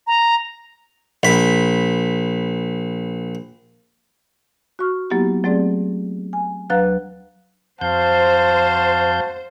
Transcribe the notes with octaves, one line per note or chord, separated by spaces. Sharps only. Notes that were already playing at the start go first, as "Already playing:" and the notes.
A#5
A#1 B5
F#4 C#6 F6
F#3 A#3 B3 E4 G4
F#3 A3 C4 G#4 D5
G#5
D2 F#3 B4 F5 A#5 F#6
F2 F#4 C5 F5 A5 G6